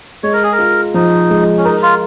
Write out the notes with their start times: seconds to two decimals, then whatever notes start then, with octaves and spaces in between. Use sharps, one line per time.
0.23 G#3 C#5
0.33 A#4
0.43 G#4
0.52 A#4
0.59 F4
0.94 F3 D#4
1.30 G#3
1.58 C#4
1.65 D#4 A#4
1.82 F4